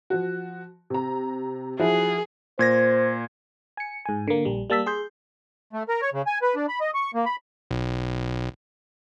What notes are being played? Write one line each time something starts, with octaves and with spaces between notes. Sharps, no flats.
F3 F#4
C3 A#5
F3 E4 F#4 G#4
A#2 C5 G#6 A#6
G#5 C#7
G#2 G#5
D3 A#3
A#1 G3
G3 A#3 A5 E6 B6
G#4 C6 G6
A3
A#4
C#5
C#3
G#5
B4
D4
B5
D#5
C#6
A#3
B5
B1